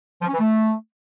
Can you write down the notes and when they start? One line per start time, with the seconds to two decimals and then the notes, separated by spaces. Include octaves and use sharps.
0.22 F3
0.28 C#4
0.34 E3
0.40 A3